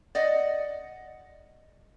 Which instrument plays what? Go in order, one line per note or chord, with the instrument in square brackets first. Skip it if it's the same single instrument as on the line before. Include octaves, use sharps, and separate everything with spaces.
[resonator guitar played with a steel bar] D5 D#5 F#5